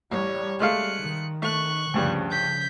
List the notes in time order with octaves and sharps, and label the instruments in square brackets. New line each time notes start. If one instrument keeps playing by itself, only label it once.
[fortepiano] A1 [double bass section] G3 [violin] C#5
[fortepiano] G#3 A3 F5 [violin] F#6 C#7
[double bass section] D#3
[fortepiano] A3 [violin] C#6 F#6
[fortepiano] D2 G2 G3 [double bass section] C#3 F3
[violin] G6 B6